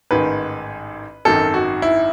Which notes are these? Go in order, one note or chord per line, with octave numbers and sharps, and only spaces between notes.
A1 G#2 D#3 B4
G#1 F#2 D#3 A4
F#4
E4